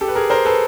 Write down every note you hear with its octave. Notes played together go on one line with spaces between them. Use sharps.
G4 A4
B4
G#4 A#4
A#4 C5
A4 B4